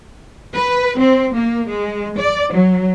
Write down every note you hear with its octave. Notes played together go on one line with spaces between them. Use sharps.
B4
C4
A#3
G#3
D5
F#3